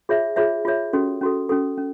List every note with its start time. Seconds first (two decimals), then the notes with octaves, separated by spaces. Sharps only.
0.09 F4 G#4 C#5 E5
0.36 F4 G#4 C#5 E5
0.65 F4 G#4 C#5 E5
0.93 C#4 F#4 A4
1.21 C#4 F#4 A4
1.49 C#4 F#4 A4
1.77 C#4